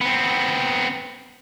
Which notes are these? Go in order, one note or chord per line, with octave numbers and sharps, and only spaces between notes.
B3 C4